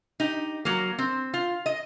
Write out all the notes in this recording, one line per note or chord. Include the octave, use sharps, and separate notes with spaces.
D#4 G4
F#3 A#3
C4
F4
D#5